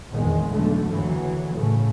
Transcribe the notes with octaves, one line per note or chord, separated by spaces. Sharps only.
A#1 E2 D#3 E3 G#3
B1 D3 A3
F#1 D2 E3 F#3
A2 C#3 A3